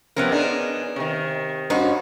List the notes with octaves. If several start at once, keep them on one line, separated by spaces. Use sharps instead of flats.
C3 F3 B3 C#4 A#4
D4 D#4 G#4
C3 D#3
G2 C#4 D#4 F#4 C5